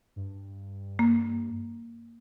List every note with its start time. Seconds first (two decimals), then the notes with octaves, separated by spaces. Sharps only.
0.16 G2
0.99 A#3